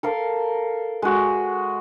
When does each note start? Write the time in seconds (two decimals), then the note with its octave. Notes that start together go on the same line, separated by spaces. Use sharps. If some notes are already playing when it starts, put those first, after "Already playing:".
0.03 A4 A#4 F5
1.02 G#3 F#4